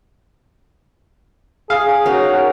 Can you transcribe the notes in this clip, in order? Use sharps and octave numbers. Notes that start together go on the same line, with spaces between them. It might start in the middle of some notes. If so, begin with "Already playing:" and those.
G#4 F5
F#3 C#4 D#4 F#4 A#4